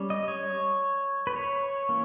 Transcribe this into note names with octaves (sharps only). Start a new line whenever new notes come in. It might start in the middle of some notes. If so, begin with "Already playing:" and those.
Already playing: G3 C#4
D#5
C#5
B4
C#5
E3 A#3 C#4